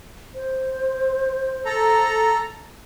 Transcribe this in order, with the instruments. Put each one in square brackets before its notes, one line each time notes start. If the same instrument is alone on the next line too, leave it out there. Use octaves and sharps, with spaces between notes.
[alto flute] C5
[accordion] A4 A#5